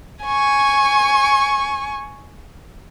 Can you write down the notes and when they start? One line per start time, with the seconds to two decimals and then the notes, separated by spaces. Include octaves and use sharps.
0.25 G#5 C#6